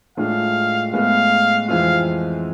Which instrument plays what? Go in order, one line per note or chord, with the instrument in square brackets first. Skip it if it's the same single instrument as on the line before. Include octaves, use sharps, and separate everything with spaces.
[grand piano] A2 G#3 D4 F4 [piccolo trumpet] F5
[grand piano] A2 G#3 B3 [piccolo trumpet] F5
[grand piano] F2 E3 G#3 C4 F4 [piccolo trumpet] F5